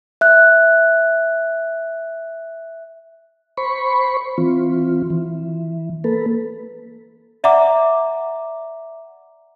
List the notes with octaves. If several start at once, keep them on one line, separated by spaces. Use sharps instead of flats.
E5 F#6
C5 B5 C#6
E3 C4 F4
E3
A#3 A4 B4
D5 E5 F#5 A#5 D6